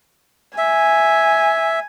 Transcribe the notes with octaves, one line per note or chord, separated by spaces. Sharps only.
E5 G#5